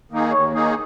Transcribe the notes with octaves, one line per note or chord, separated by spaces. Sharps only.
D#3 A#3 D#4 G#4
D#2 C#5
D#3 A#3 D#4 G#4